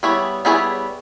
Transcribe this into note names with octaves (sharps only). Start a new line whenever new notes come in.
G3 B3 E4 G#4 C#5
G3 B3 E4 G#4 C#5